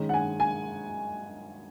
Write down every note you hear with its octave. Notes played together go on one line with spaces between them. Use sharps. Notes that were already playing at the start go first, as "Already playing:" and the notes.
Already playing: D#3 G#3 C#4
F#5
G#5
G#5